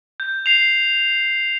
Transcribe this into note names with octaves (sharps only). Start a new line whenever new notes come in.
G6
C7 F7